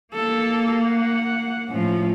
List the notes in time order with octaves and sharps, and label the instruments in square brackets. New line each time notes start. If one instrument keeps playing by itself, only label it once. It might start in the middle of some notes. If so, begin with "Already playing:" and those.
[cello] A#3 [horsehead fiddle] A4
[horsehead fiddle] F#5
[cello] A2 F3 [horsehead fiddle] C#4 F4